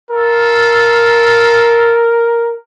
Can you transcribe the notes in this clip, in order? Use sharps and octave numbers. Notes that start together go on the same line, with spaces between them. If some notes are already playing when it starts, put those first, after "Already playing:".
F4 A4 A#4